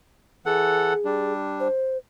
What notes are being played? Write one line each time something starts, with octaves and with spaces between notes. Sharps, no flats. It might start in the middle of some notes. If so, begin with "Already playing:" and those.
E3 G#4 A4 F#5
G3 D4
C5